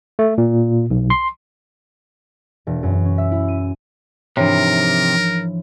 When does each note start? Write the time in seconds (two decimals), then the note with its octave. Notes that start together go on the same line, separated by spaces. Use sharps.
0.19 A3
0.38 A#2
0.90 B1
1.10 C6
2.67 E1
2.83 F#2
3.05 C#4
3.18 E5
3.32 E4
3.48 D#7
4.37 G#2 C3 E3 F3 D4 A#4 C#5